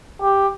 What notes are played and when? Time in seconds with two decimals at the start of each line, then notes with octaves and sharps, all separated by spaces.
0.22 G4